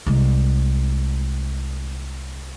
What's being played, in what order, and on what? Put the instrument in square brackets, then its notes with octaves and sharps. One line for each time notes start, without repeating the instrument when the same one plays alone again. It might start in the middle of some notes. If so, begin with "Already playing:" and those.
[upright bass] C2 G#3